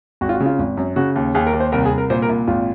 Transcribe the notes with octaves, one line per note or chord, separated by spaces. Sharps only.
G#1 F#4
F4
F#4
C#3
F4
G#1
F#2
C#3 F#4
D#2
D#2 G#4
A#4
D#2
C5
C2 A#4
G#4
C2
A#4
A#2 C5
A#4
A#2
G#1 F4